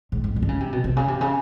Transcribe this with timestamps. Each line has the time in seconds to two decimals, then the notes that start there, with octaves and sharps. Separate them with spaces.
0.12 G#2
0.24 G#2
0.36 G#2
0.42 D3
0.49 C#3
0.60 C3
0.73 B2
0.84 C3
0.97 C#3
1.08 C3
1.21 C#3